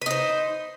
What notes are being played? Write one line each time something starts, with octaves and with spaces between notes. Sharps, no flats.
D#4 B4 C5